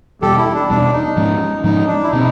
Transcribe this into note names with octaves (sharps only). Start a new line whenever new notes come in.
E2 B2 G3 G4 A4
E4
D4
E2 B2 G3 D4
D#4
G#2 F3 G#3 C#4
G#2 F3 G#3 C#4 D#4
D4
E4
B2 G3 C4 D#4